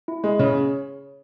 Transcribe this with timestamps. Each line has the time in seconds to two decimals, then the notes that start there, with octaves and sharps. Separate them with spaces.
0.08 E4
0.24 G#3 G#4
0.39 C#3 C#5